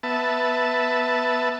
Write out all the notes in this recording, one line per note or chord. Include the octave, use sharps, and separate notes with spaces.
B3 E5 A5